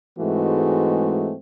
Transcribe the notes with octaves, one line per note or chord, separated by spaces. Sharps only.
G#2 E3 G#3 A3 C4 F#4